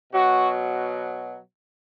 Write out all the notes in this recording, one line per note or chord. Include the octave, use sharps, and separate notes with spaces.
B2 F#3 F#4